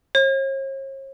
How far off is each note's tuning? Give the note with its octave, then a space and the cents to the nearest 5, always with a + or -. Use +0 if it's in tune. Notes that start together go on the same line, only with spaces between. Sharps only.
C#5 -45